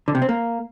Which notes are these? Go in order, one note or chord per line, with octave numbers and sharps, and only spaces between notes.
D3
C3
C4
A#3